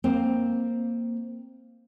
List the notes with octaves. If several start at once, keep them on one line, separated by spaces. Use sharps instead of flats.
A#3 C4